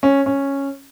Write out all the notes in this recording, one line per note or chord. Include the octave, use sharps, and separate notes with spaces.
C#4
C#4